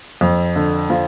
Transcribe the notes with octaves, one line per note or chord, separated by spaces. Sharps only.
F2
D3
F3